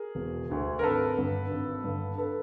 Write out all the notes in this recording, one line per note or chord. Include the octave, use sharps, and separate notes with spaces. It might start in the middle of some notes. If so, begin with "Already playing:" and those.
Already playing: G#4 A#4
E1
D2 D3
A#4
G#1 A4 B4
G2 D3
G#1
G2 D3
A4 B4